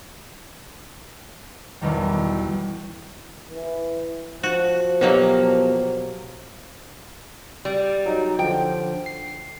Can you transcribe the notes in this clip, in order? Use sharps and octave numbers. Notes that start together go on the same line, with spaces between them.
B1 E2 D#3 G3
E3
F3 F#4
B2 F#3 A#3 B3 G4 F5
G3
F#3 D#4
D3 F3 G5
C7